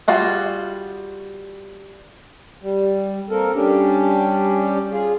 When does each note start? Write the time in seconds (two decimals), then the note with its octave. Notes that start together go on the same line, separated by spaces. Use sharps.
0.08 G3 F4 F#4 G#4
2.62 G3
3.30 A#3 C4 A4 A#4
3.54 G3 C#4 D4 G4
4.91 F4 G#4